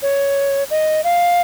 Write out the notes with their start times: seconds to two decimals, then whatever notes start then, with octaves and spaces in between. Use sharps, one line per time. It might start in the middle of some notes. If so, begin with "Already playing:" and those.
0.02 C#5
0.70 D#5
1.04 F5